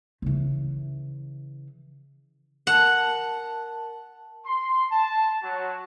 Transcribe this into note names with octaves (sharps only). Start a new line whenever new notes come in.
C#3 E3
A#4 F#5 A5
C6
A5
F#3